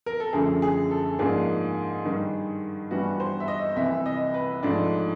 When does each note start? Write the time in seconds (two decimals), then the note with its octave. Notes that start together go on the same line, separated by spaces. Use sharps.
0.06 A#4
0.20 A4
0.33 F#2 D3 F3 A3 G#4
0.62 G#4
0.91 A4
1.19 G#2 F3 A#3 D4 G#4
2.05 G2 D#3 G3
2.91 G2 E3 G3 B3 F#4
3.20 C5
3.40 E5
3.48 D#5
3.76 C2 C3 E3 E5
4.06 D#5
4.34 B4
4.63 G#2 F3 A3 D4